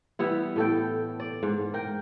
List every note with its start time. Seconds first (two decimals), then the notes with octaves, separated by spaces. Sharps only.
0.19 E3 G3 B3 E4
0.56 A2 A4 G5
1.20 D5
1.43 G#2
1.74 A#4 G5